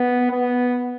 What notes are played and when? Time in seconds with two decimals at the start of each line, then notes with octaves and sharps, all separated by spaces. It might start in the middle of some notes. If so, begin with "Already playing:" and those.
Already playing: B3
0.31 B3